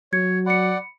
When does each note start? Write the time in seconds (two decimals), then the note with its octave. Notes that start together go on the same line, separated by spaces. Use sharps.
0.13 F#3 C#5 G#6 C#7
0.46 D5 F#5 B5 C#7